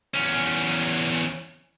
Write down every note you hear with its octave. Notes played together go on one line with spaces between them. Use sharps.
E2 C#4